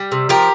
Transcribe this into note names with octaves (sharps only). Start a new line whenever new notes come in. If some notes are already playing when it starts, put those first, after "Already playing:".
Already playing: G3
C3
F3 G4 A#4